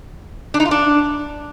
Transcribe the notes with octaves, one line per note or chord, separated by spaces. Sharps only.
D4
D#4
F4
D4